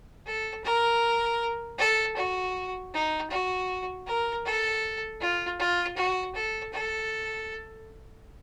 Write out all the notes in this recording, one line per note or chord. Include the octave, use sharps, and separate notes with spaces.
A4
A#4
A4
F#4
D#4
F#4
A#4
A4
F4
F4
F#4
A4
A4